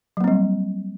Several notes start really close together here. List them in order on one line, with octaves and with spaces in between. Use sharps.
F#3 A#3 C4 G3